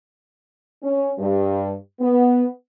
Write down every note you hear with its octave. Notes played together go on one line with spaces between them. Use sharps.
C#4
G2
B3